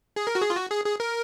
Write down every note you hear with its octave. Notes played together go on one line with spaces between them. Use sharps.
G#4
A#4
F#4
G#4
F4
F#4
G#4
G#4
A#4